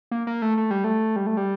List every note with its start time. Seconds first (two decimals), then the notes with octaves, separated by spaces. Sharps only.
0.11 A#3
0.27 A#3
0.42 A3
0.57 A3
0.71 G3
0.84 A3
1.16 G3
1.27 A3
1.37 G3